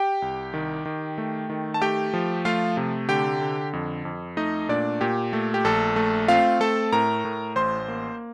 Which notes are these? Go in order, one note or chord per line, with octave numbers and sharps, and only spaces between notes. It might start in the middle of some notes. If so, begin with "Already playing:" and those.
Already playing: G4 G5
C2
D#3
D#3
A3
D#3
A5
A3 G4 G5
F3
A3 F4 F5
C3
D3 G4 G5
D3
F2
F2
A3 D#4 D#5
A#2 D4 D5
A#2 G4
A3
G4
A#1 A4
A3
C4 F4 F5
A3 A4 A5
A2 A#4 A#5
A2
A1 C5 C6
A#3